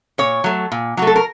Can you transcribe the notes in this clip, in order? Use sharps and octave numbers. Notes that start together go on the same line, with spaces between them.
A#2 C#5
F#3 A3
A#2
F#3 A3 F#4
A4
A#4